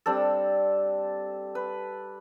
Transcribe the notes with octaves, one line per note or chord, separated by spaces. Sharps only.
G3 C4 D4 A4
B4